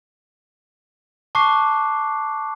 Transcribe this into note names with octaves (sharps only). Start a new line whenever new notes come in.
A5 C#6 D6 F#6 C7